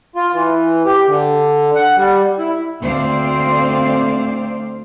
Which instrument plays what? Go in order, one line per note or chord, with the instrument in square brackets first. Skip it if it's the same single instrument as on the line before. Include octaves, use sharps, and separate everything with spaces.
[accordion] F4
E3
G4
D3
F#5
G3
E4
[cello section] D2 C4 C5 D5 F5